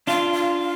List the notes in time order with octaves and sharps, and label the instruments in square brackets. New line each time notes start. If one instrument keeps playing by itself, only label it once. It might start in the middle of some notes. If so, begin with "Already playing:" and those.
[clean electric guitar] D4 F4 [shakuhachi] F5
[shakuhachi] F5
F5